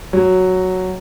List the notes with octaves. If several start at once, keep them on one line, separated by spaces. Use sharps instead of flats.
F#3